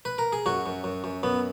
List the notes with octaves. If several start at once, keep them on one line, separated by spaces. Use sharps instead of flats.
B4
A#4
G#4
F#2 F#4
F#2
F#2
F#2
F#2 B3